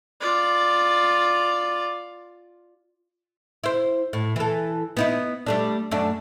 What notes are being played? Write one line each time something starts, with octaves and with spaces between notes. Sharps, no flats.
F4 D5
E4 C5
A2
E3 A4
B3 D#4 E4
G3 A3 D4
F#2 A3 D4